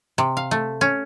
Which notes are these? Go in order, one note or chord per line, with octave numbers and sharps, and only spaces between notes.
C3
F5
A3
C#4